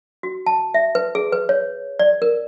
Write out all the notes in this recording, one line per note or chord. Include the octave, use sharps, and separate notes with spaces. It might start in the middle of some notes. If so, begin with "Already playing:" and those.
F#4
A5
E5
B4
G#4
B4
C#5
D5
A#4